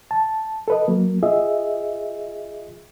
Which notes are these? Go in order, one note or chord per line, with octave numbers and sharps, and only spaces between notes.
A5
A4 B4 D#5
F#3 A#3
F4 G#4 D#5 E5